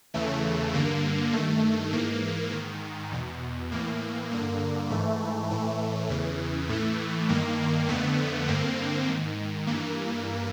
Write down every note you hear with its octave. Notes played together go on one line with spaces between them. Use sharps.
E2 C#3 E3 A3
G2 D3 A#3
G2 D#3 A3
G#2 E3 A#3
G#2 D#3
E2 B2
A2 E3 A#3
G2 D3 A#3
G#2 E3 A3
A2 E3 A3
E2 C#3 E3
A2 E3 A3
G2 D#3 A#3
F2 D3 A3 B3
G2 D3 A#3 C4
G#2 D#3
G2 E3 A#3